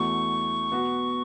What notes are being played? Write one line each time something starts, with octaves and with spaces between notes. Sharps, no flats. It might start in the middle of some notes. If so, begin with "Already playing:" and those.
Already playing: E2 E3 A3 F#4 C#6
B2 B3 F#4